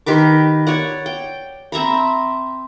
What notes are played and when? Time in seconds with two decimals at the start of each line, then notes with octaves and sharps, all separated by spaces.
0.06 D#3 G4 B4 D6
0.67 C#5 D5 F#5
1.06 G5
1.72 C4 E5 A#5 B5